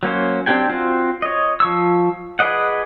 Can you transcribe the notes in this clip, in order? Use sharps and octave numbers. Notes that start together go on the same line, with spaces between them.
F#3 A#3 C#4 C5
C4 D4 G4 G5 G#5
C4 F4 F#4 C5
C#5 D#5
F3 C#6 E6
G#4 B4 D5 D#5 F#5